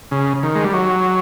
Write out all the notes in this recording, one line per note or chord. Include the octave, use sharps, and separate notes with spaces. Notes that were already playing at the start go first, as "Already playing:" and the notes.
C#3
D#3
G#3
G3
F#3